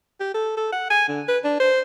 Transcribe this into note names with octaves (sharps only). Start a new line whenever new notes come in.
G4
A4
A4
F#5
G#5
D3
B4
D4
C5